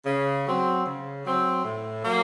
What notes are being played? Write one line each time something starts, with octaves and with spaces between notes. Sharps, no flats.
C#3
F#3 C4
C#3
F#3 C4
A2
F#3 A#3